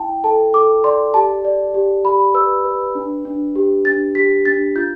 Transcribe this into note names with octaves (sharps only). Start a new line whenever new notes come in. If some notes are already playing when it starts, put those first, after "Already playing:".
Already playing: E4 G5 A5
A4 A5
A4 D6
D5 C6
G4 A5
D5
G4
G4 B5
B4 E6
B4
D4
D4
G4
D4 A6
G4 B6
D4 A6
F4 G6